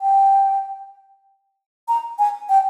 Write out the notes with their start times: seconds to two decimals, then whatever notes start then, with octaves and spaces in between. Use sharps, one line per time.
0.01 G5
1.88 A#5
2.19 G#5
2.49 G5